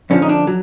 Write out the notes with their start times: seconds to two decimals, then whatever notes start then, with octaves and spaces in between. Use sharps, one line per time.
0.10 F2 D3 F3 C#4
0.22 D#4
0.29 D4
0.47 F#3